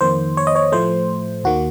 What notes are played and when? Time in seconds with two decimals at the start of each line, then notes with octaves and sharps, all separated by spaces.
0.01 F2 D#3 A#3 C5
0.37 C#5
0.47 D#5
0.56 C#5
0.72 A2 F3 A3 C5
1.44 D#2 D#3 A#3 F#4